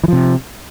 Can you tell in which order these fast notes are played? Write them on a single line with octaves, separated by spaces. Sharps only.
E3 F3 C3